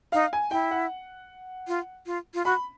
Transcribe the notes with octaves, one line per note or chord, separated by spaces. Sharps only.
D#4 F5
G#5
E4 G5
F#5
F4
F4
F4
F#4 B5